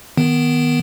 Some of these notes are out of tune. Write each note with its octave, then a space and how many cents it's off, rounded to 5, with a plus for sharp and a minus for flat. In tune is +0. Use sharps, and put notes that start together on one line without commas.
D#3 +5 B3 +0